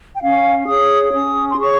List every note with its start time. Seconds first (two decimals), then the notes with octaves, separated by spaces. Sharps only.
0.14 G5
0.21 C#4 F5
0.67 G#4 C#5 D#6
1.12 C#4 D#6
1.51 C6
1.58 G#4 C#5 C#6